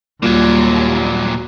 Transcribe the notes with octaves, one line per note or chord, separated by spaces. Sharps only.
D#2 A#2 F#3 G3 A#3 F4